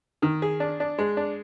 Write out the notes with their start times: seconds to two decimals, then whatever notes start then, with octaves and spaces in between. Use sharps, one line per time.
0.22 D#3
0.42 G#4
0.60 D4
0.80 D4
0.98 G#3
1.17 D4